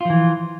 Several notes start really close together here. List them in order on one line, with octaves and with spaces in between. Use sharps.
F4 F3 E3